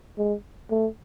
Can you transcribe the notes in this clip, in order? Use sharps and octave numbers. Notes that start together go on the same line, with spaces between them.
G#3
A3